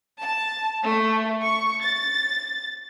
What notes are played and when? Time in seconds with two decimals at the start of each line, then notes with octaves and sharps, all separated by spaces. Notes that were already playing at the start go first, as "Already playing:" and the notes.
0.21 A5
0.83 A3
1.44 C#6
1.82 A6